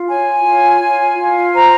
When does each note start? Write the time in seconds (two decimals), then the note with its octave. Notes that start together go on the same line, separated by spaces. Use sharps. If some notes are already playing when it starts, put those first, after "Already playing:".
Already playing: F4
0.09 C#5 G#5
0.45 F4
0.82 F4
1.19 F4
1.55 C5 A#5